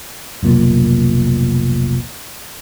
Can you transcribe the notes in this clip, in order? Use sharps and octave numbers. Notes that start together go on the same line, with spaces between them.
F1 B1 A#2